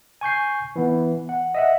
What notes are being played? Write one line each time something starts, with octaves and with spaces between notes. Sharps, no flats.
G#5 C#6 G6 C7
E3 B3
F#5
D#5 E5 F#5